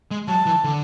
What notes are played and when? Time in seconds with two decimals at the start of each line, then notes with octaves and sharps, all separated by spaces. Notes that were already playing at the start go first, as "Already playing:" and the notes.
0.11 G#3
0.28 F#3 A5
0.46 E3
0.64 D3